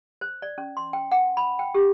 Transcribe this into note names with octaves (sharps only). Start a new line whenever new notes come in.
C5
D5
C#4
C6
G5
F#5
B5
G5
G4